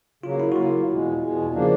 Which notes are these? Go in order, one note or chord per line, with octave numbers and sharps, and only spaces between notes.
C#3 F#3 A#3 F4
E4
F#4
C#3 F#3 A#3 F4
E2 B2 G#3
E2 B2 G#3
C#3 F3 A#3 D4